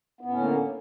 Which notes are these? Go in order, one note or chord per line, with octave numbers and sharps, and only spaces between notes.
A2 D3 A#3 B3 C#4